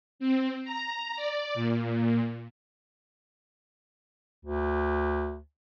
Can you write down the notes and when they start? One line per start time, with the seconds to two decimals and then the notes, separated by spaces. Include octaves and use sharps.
0.19 C4
0.64 A#5
1.16 D5
1.54 A#2
4.45 D2